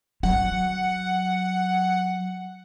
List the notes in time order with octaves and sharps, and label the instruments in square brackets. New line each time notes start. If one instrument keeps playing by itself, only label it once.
[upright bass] F#3 [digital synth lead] F#5